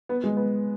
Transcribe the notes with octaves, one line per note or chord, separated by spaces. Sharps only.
B3
G#3
B3